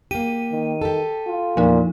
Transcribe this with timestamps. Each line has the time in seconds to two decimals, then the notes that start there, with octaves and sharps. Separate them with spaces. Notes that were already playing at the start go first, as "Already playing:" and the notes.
0.11 A#3 G4 D#7
0.52 D#3
0.82 G4 A4
1.27 F4
1.57 E2 A#2 F3 D#4